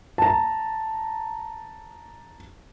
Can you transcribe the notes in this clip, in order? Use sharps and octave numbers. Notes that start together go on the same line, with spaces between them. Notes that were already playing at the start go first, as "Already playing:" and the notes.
A5 A#5